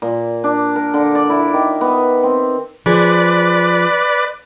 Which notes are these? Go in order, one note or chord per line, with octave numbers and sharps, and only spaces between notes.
A#2
D4
A#4
D3
D5
E4
D#3
B3
C4
F3 G#4 B4 D5